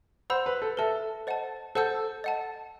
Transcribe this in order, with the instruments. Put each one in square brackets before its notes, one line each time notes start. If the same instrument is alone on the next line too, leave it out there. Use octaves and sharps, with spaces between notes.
[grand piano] C5 [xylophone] F#5 B5 E6 G6
[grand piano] B4
A4
[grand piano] A4 [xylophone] B4 E5 A5
[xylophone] C5 D#5 F#5 A5
[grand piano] A4 [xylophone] C5 F#5 A5 E6 G6
[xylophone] D#5 F#5 A5